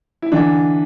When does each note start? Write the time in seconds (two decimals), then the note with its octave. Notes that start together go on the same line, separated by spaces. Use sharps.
0.22 E4
0.32 D3 E3 D4